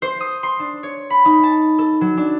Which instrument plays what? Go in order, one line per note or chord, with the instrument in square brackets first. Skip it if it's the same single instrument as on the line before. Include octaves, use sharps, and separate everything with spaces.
[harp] C5
D#6
C6
D4
C#5
B5
D#4
A5
A4
F#3
D4